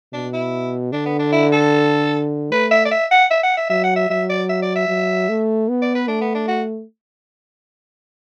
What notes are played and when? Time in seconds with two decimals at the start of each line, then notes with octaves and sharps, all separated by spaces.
0.13 B2 D4
0.33 E4
0.92 D3 D4
1.06 B3
1.19 D4
1.32 E4
1.52 A4
2.52 A3 B4
2.71 E5
2.85 D5
2.91 E5
3.11 F#5
3.30 E5
3.43 F#5
3.57 E5
3.70 F#3 E5
3.84 F#5
3.96 E5
4.10 F#3 E5
4.29 D5
4.49 E5
4.62 D5
4.76 E5
4.88 F#3
5.29 A3
5.69 B3
5.82 D5
5.95 B4
6.08 A3 D4
6.21 B3
6.34 D4
6.48 F#4